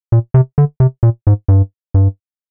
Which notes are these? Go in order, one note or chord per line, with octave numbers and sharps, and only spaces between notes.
A#2
C3
D3
C3
A#2
G#2
G2
G2